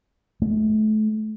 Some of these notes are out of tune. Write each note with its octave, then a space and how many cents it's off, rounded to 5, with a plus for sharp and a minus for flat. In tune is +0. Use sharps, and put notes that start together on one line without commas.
A3 -35